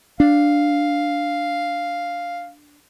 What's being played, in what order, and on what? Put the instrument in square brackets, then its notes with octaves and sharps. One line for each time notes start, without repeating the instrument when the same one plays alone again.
[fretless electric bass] D4 [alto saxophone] F5